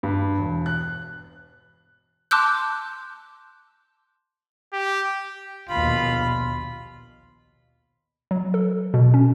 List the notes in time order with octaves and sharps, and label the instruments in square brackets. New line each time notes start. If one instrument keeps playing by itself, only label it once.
[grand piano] G2
E1
F#6
[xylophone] A5 C6 D6 E6 F#6 G6
[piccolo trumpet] G4
[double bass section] A#1 D#2 B2 [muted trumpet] F4 [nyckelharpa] B5
[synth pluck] F#3
A4
B2
C#4